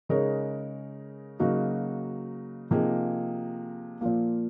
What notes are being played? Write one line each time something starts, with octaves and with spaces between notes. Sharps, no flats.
C#3 G#3 D#4 A#4 C#5
C#3 F#3 A#3 D#4 F#4
C3 F3 A#3 D#4 G#4
A#2 F3 A#3